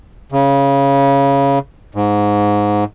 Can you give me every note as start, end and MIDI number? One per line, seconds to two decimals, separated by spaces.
0.32 1.59 49
1.95 2.84 44